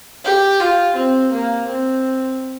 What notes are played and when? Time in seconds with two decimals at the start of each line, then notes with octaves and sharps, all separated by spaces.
0.25 G4
0.60 F4
0.96 C4
1.32 A#3
1.68 C4